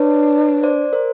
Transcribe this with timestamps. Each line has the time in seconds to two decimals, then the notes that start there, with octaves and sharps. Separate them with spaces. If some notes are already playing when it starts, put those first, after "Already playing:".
Already playing: D4 B4 C#5
0.63 C5 D5
0.93 A#4 C5